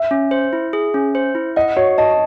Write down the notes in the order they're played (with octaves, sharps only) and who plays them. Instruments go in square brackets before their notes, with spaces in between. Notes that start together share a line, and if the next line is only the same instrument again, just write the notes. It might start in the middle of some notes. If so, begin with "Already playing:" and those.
Already playing: [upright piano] E5
[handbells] C#4
C5
E4
G#4
C#4
C5
E4
[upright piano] D#5 [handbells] F#5
[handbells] F#4 [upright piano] C#5
[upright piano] D#5 [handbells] A5